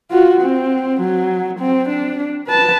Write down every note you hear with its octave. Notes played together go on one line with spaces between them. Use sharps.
F4 F#4
C4
F#3
C4
D4
B4 A5